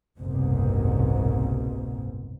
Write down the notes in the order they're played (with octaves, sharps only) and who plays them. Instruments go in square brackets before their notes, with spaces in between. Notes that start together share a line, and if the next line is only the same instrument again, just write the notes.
[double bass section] F#1 C2 G#2 B2